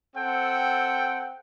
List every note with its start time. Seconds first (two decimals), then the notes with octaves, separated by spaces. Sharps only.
0.16 C4 A4 F#5 G5